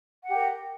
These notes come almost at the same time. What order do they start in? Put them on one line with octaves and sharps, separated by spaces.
F#5 G4 A#4